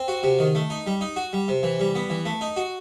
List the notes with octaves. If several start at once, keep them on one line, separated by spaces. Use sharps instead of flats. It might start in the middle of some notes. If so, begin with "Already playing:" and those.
Already playing: C4
F#4
C3
D#3
A3
D#4
G3
D#4
F#4
G3
C3
E3
G3
B3
E3
A3
D#4
F#4